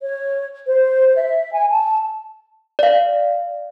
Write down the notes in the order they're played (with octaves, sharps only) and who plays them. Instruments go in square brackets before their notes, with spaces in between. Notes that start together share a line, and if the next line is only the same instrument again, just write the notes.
[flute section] C#5
C5
E5
G#5
A5
[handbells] D5 F5